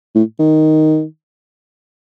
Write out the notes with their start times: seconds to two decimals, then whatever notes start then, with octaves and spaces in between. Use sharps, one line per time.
0.15 A2
0.39 D#3